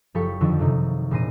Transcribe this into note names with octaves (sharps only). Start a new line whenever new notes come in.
F#1 F3 G4 A4 C#6 B6
F2 D3 D#3 F3
F#1 C3 D#4
E1 A#2 C5 C6 A#6 D#7